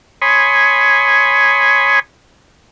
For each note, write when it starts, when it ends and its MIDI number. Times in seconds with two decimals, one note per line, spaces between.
0.22 1.99 73
0.22 1.99 80
0.22 1.99 83
0.22 1.99 84
0.22 1.99 87